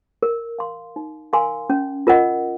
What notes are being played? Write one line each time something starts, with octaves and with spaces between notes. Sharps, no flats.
A#4
F5 C6
D#4
A#4 F5 G#5 C6
C#4
F4 A#4 D#5 F#5